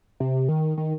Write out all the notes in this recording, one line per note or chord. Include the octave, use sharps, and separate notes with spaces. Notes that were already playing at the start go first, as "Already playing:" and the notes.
C3
D#3
D#3